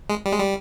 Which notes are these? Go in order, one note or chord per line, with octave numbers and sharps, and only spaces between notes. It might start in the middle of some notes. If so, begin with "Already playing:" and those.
G#3
G3
G#3
G3